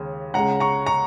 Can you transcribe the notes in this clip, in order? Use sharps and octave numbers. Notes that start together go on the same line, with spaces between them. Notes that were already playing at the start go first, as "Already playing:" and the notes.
Already playing: D#2 C#3 G#3
C#2 C#3 G#3 F#5 A#5
A#5 C#6
A#5 C#6